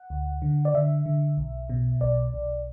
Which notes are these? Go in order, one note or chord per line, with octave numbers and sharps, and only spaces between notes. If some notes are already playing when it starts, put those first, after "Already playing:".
Already playing: F#5
D2
D3
D5
D3 E5
D3
B1
B2
B1 D5
B1